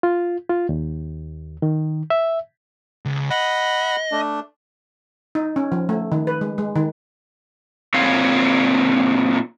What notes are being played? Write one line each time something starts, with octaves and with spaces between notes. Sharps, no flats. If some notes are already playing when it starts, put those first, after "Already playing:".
F4
F4
D#2
D#3
E5
C#2
D#5 F#5 B5
A3 D4
D#4
C#4
F3
A3
D#3
B4
G#3
G#3
D#3
A#2 C4 D#4 C#5 F5